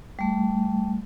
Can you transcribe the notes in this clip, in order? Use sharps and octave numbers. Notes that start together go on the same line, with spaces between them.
G3 A3